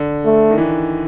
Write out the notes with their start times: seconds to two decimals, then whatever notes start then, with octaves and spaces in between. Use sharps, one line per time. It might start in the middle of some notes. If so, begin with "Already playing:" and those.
Already playing: D3
0.25 A3
0.51 D#3
0.58 E3